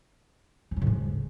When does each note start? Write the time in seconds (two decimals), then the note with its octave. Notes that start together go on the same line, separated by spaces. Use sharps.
0.71 F3
0.76 F#3
0.82 A2
0.87 G#2